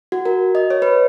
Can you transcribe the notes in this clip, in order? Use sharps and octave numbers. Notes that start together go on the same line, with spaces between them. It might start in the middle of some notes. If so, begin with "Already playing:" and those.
F#4
A#4
D#5
C#5
B4